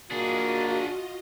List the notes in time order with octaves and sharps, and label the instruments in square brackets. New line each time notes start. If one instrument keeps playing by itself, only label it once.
[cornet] A#3 [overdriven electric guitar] D4 G#4 [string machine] F4 D#5 [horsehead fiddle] F#4